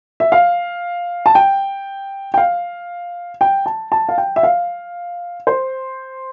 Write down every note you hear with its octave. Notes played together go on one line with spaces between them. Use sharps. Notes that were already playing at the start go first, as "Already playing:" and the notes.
E5
F5
A5
G5
G5
F5
G5
A5
A5
F5
G5
E5
F5
C5